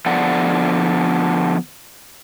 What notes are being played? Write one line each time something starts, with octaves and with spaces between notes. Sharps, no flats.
D3 F3 B3 D5 F#5